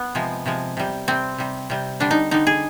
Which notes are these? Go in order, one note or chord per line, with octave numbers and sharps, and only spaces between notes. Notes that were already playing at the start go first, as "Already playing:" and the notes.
Already playing: B3
C3 F3 G#3
C3 F3 G#3
C3 G3
C3 G3 C4
C3 G3
C3 G3
D3 G3 D4
D#4
D3 G3 D#4
G#4